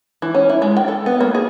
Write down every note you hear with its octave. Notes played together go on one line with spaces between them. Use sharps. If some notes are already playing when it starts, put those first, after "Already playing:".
E3
C#4
E4
G#3
G5
A4
B3
A#3
G#4